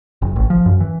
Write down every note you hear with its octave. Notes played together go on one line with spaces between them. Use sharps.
F#1
A1
F3
F#2
E3